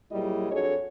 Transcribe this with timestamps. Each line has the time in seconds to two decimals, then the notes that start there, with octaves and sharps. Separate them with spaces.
0.11 A#2 F#3 G3 E4 G#4 D#5
0.51 F2 D4 F#4 G#4 A4 C#5